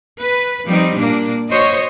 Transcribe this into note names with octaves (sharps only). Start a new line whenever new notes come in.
B4
F3 G3 C4 D#4
A#2 A#3 D4
F#4 C5 C#5 D#5